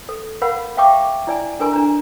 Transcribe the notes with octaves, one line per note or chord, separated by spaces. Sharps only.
A4
A#4 F5 F#5 B5
E5 F5 G5 C#6 D6
E4 D5 G#5
D4 A4 A#4 G#5 A#5 C6
D4 A#5